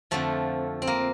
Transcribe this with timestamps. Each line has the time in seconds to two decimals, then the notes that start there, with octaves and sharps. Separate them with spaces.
0.11 F2 D3 F3 A3
0.82 C4
0.87 A#3